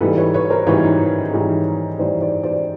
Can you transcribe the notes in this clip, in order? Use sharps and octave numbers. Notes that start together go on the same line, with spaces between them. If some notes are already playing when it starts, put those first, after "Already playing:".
G#2 E3 G3 A4 B4
B4 C#5
B4 C#5
A#4 C5
G#2 E3 G3 B4 C#5
G#2 E3 G3
G#2 E3 G3 C5 D5
C5 D5
C5 D5